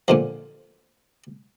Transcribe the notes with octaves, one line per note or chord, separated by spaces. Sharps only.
A#2 D3 F3